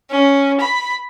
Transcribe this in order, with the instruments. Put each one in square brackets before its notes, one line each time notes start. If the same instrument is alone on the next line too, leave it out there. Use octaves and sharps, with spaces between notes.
[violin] C#4
B5